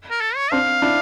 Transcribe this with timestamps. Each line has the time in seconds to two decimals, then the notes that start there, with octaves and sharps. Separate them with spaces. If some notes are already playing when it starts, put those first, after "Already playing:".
0.11 A#4
0.21 A4
0.36 C#5
0.52 C4 D4 F5
0.82 D4 E4